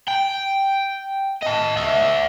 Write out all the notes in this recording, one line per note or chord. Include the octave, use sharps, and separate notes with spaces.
G5
D#5 A5
D5 E5